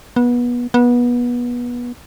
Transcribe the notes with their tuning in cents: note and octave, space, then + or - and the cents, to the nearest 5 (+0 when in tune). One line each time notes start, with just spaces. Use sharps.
B3 -25
B3 -25